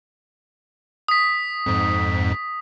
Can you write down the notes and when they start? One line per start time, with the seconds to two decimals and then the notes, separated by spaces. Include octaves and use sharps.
1.08 D#6 B6
1.66 F2 G#2